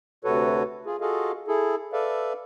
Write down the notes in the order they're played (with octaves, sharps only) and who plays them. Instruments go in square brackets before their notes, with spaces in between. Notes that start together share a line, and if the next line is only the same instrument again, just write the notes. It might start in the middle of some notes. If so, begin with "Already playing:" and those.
[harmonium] D2 C3 F#4 A4 B4 C#5
F4 G#4
F4 F#4 G#4 A4 D#5 F5
E4 G#4 A4
A4 B4 D5 E5 F5